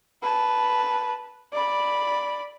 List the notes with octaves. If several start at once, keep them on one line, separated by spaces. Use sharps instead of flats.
B4 A5
D5 B5